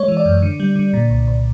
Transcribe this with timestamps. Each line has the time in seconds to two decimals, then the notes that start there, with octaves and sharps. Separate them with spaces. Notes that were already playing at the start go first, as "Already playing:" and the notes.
Already playing: G#3 C#5
0.08 E3
0.17 D5
0.25 F#2
0.42 D3
0.60 G3
0.76 D3
0.93 A#2
1.10 C2
1.27 C2